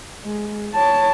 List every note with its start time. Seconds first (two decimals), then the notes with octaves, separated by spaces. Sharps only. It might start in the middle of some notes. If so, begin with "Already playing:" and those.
0.25 G#3
0.75 C#5 A5